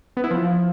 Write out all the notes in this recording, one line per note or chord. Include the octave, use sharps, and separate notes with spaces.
B3
E4
F3